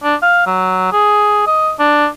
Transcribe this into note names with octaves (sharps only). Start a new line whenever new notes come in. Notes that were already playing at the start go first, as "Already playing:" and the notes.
D4
F5
F#3
G#4
D#5
D4